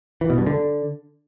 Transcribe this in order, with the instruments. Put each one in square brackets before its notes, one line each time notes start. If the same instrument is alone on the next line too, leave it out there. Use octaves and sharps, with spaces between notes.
[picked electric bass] E3
B2
G2
D3